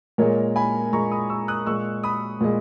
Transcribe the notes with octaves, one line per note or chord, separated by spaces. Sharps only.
A#2 G#3 A#4 C#5
G#5 B5
A#2 G#3 A#5 C#6
B5 D#6
C#6 E6
D#6 F#6
A#2 G#3 C#6 E6
B5 D#6
A#2 G#3